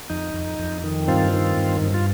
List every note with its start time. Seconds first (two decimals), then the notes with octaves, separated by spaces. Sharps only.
0.10 F2 D#4
0.34 F2
0.59 F2
0.84 D#3
1.08 G2 C4 F4
1.32 D#3
1.57 G2
1.82 G2
1.94 F4